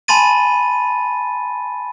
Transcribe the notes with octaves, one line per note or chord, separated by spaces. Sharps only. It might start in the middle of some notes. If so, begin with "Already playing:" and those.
G#5 A5 B5 C6 A6 D#7